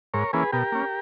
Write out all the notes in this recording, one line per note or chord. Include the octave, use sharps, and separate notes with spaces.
G#2 A#4 C#5
E3 A#3 C#4 G#4 B4
B2 G4 A#4
A#3 C#4